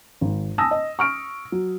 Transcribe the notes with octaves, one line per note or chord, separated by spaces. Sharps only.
G#1
G#5 A5 D#6 E6 A#6
D#5
C#6 F6 D7
F#3